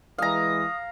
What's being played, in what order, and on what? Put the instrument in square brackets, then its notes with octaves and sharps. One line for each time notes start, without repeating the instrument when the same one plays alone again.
[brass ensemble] E3 G#3 [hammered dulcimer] F5 A#5 [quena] D#6